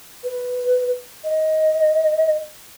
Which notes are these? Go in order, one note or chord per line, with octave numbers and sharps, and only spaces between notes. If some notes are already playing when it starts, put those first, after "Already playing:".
B4
D#5